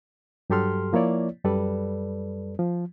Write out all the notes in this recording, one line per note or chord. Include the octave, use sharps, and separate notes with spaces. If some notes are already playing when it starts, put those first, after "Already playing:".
G2 F#3 G4 A4 C6 F6
F3 A#3 E4 C#5 D5
F#2 G3 A4 B4 D5
F3